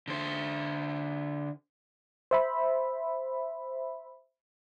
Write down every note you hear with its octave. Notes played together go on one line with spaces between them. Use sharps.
D3 C5
C5 E5 B5